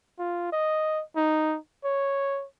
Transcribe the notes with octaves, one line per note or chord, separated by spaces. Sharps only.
F4
D#5
D#4
C#5